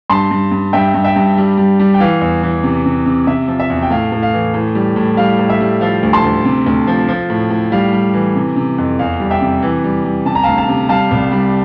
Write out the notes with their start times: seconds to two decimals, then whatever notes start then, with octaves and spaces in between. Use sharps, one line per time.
0.10 G2 A5 C6
0.31 G2
0.52 G2
0.73 G2 E5 G5
0.94 G2
1.04 E5 G5
1.16 G2
1.37 G3
1.58 G3
1.80 G3
1.94 G5
2.00 E3 F5
2.21 E2
2.43 E3
2.64 C3
2.86 C3
3.06 C3
3.27 C3 E5
3.48 F3
3.60 E5
3.70 E2
3.83 G5
3.91 A2 F5
4.12 A2
4.23 F5
4.33 E3
4.54 A2
4.75 G3
4.96 A2
5.17 G3 F5
5.39 A2
5.50 E5
5.61 G3
5.81 F3 F5
6.03 D2
6.13 A5 C6
6.24 D2
6.45 C3
6.66 D2
6.87 F3
7.08 F3
7.30 A2
7.51 A2
7.72 G3 F5
7.93 G3
8.14 E3
8.36 C3
8.56 C3
8.78 F2
8.99 E2 F5
9.20 G3
9.31 E5 G5
9.41 C3
9.62 E3
9.84 G3
10.04 G3
10.25 C3 A5
10.35 A#5
10.44 F5 A5
10.47 D2
10.58 F5 A5
10.68 C3
10.89 G3 F5 A5
11.11 C2
11.32 G3